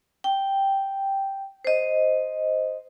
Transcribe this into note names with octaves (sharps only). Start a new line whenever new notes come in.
G5
C5 D#5